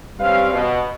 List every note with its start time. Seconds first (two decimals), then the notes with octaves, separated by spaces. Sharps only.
0.20 G3 C4 C#4 B4 F5
0.52 B2